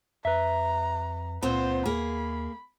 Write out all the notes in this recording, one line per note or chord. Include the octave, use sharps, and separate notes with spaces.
F2 B4 E5 A#5
C#2 A#2 B3 C4 C5
D#2 A#3 G#4 B5